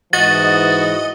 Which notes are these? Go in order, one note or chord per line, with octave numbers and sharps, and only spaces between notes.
G#2 E3 F#4 D#5 A6